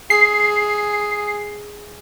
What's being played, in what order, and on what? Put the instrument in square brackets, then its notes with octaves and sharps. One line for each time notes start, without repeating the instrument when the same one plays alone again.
[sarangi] G#4 [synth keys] C7